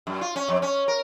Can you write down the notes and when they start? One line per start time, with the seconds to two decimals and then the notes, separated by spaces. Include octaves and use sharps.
0.07 F#2
0.21 F4
0.36 C#4
0.48 F2
0.62 C#4
0.88 A#4